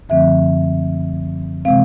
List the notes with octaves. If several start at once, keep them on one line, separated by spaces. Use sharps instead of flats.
F#2 D3 F3 A3 C4 E5
C3 E3 G#3 C4 F5